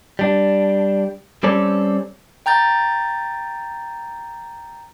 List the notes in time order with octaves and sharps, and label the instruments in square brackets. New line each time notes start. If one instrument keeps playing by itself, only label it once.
[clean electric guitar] G3 D4
G3 C4 C#4 A4 D5
[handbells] G5 A#5 G6 A6